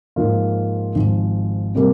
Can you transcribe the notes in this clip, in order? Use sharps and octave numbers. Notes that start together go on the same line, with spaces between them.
G#2 F3 A#3 F4
G#1 G#2 F3
C3 G3 A#3